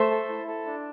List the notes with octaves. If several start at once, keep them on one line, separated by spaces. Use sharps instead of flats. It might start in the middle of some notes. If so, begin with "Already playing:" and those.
Already playing: A3 C5 E5
A4
E4
A4
D4